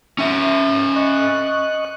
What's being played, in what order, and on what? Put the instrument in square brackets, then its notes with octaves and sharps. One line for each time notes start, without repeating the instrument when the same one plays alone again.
[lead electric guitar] C#4 E5
[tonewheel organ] D#5 C#6 F#6